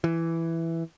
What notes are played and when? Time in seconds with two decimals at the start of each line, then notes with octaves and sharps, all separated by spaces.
0.04 E3